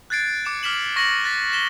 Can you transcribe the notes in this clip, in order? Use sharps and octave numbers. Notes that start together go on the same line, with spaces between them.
F#6 G#6 A6 C7 D7
D6 C#7 E7
D6 F6 B6 E7 F#7
C#6 A#6 B6 C#7 F#7
F#6 A6 B6
B6 E7 G7